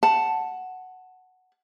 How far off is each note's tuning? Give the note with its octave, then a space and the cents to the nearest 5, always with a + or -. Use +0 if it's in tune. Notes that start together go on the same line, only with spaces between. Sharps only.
F#5 +0 A5 +0